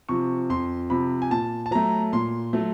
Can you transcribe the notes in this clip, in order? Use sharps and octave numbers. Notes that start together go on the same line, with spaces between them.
C3 F3 C#6
F2 C6
C3 F3 B5
G#5
A#2 A5
A5
F#3 A3 A#5
A#2 C6
F#3 A3